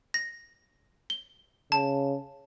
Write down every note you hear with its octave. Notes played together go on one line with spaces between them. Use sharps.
A#6
G7
C#3 A5